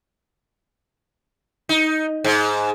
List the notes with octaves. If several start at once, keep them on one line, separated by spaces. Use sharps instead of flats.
D#4
G#2